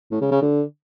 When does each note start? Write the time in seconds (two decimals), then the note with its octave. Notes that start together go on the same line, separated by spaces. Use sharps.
0.11 A2
0.21 C#3
0.32 C#3
0.42 D3